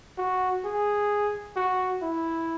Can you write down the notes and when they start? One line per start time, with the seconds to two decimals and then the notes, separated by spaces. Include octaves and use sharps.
0.18 F#4
0.65 G#4
1.56 F#4
2.03 E4